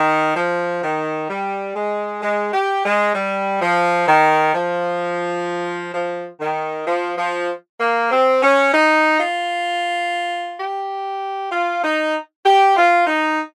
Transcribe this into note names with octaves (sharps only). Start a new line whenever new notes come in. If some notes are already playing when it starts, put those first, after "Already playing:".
Already playing: D#3
F3
D#3
G3
G#3
G#3
G4
G#3
G3
F3
D#3
F3
F3
D#3
F3
F3
A#3
C4
C#4
D#4
F4
G4
F4
D#4
G4
F4
D#4